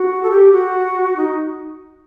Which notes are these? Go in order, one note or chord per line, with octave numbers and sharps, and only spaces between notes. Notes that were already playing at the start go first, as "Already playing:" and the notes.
Already playing: F#4
A4
G4
F#4
D#4